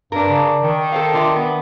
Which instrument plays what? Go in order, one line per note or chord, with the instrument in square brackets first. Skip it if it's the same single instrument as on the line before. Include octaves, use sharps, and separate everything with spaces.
[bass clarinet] G2 [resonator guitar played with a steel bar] D4 A#4
[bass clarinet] C#3
D#3
[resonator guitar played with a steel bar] A4 C5 F5
D3 F4 E5
B3